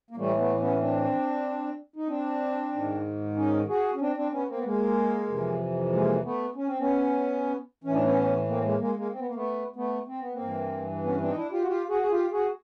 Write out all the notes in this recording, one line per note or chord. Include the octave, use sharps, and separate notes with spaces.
A#3
A2 E3 G3 A3
A3 B3
B3 C#4
C4 D4
D#4
C4 D4
G#2 D#3
C#4 D#4
F#4 G#4
C#4
C4 D4
C4 D4
B3 C#4
A#3 C4
B3
G#3 A#3
F2 C3 E3
G#3 A#3
A3 B3
C#4
C4
B3 C#4
A2 E3 C#4
D4
B3 C#4
A#3 C4
G#3 A#3
G#3 A#3
G#3 A#3
C4
B3
A#3
A3 B3
A3 B3
C4
B3
A#3 C4
G2 E3
B3 C#4
C4 D4
D#4
D4 E4
F4 G4
F#4
F4 G4
F#4 G#4
G#4
F4 G4
F#4 G#4